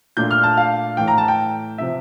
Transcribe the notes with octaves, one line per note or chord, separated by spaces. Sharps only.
A#2 A3 D4 F4 G6
F6
A5
F5
A2 E3 A3 G5
A#5
A5
G5
C3 F3 C4 E5